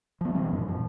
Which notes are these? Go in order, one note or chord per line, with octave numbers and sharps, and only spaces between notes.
F3 B3
B2 E3 G3 C4
F#2 A#2
F3